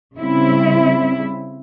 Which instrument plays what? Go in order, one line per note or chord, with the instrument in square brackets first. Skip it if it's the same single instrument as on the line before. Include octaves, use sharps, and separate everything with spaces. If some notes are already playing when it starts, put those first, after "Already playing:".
[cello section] C#3 G3 C4 E4